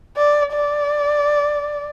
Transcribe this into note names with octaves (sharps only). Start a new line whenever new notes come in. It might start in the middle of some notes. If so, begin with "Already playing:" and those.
D5
D5